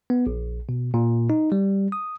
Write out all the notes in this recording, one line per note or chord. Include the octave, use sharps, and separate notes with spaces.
B3
A#1
B2
A#2
D#4
G3
D#6